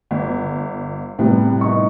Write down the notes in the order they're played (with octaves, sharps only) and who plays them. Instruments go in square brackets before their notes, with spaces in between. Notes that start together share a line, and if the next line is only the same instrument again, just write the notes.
[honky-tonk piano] G1
[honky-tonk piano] A2 B3 [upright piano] C3 G3
[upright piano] D#4 C#6